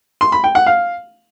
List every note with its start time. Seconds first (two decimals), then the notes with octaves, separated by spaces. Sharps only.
0.21 C6
0.32 B5
0.44 G5
0.55 F#5
0.67 F5